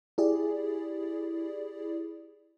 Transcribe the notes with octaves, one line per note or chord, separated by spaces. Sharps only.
E4 G4 G#4 D5